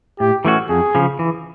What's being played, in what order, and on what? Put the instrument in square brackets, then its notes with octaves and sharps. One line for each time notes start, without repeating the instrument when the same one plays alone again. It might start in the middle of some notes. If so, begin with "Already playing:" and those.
[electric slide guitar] A2 [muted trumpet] G4
[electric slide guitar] E3 A3 C#4 F#4
[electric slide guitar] F2 [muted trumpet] G#4
[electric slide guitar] C#3 F3
E3